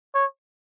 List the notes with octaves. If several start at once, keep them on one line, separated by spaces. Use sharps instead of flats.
C#5